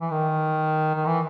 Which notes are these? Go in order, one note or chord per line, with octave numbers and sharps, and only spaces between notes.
E3
D#3
D#3
E3